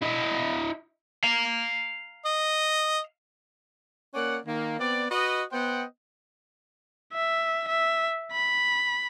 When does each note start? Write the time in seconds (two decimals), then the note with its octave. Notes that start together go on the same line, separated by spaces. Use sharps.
0.02 E4 D#5
1.24 F5 A#5
2.25 D#5
4.14 A#3 C#4 D5 F#5
4.46 D#3 A#3
4.80 B3 C4 D5
5.11 F#4 B4 D#5
5.52 B3 C5 D#5 F#5 G5
7.13 E5
7.68 E5
8.32 B5